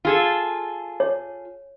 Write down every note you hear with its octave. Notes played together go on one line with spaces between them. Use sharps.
F4 G#4 A4
C#5